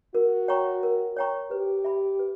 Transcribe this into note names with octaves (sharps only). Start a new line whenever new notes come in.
F#4 A#4
C#5 G5 A#5 C#6
A#4
C#5 G5 A#5 C#6
G4 B4
E5 B5
B4